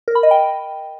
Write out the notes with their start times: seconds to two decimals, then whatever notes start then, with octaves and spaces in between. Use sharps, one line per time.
0.08 A#4
0.15 B5
0.23 D#5
0.31 G5